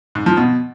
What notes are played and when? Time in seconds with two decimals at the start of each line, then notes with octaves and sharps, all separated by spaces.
0.15 G#2
0.26 F3
0.37 B2